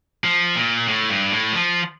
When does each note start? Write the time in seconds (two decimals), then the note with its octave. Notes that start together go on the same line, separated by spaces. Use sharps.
0.24 F3
0.56 A#2
0.88 A2
1.09 G2
1.32 A2
1.52 F3